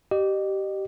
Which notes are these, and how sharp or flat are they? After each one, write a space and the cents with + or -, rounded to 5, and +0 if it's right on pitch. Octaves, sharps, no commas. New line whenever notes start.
G4 -20 D#5 -35